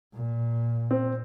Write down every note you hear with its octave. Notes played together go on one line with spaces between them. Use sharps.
A#2
C4